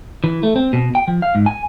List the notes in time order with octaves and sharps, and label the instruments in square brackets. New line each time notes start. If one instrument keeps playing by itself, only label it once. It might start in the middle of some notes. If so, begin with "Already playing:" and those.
[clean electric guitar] E3
A3
C4
B2
G5
F3
F5
G#2
G#5